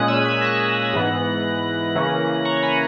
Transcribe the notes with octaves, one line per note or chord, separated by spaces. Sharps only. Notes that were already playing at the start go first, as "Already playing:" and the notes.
Already playing: A#2 G#3 C#4 D#6 F#6
E6 G#6
G#6 B6
F#6 A#6
G#2 E3 B3
C#3 E3 A#3 C#4
A#5 C#6
A#5
G#5 B5